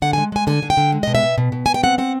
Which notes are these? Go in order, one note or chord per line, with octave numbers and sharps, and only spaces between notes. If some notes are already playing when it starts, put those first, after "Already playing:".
D3 F#5
G#3 G#5
G#3 G#5
D3 G#5
D3
G5
D3
G#3
B2 D#5
E5
B2
B2
B2
B2 G#5
G5
C4 F#5
C4 F#5